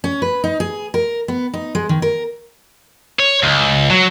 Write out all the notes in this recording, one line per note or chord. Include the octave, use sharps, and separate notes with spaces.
C#4
B4
D#4
G#4
A#4
B3
D#4
G#3
D#3
A#4
C#5
C#2
F#3